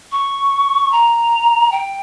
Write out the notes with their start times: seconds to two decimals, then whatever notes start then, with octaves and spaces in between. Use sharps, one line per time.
0.12 C#6
0.92 A#5
1.72 G5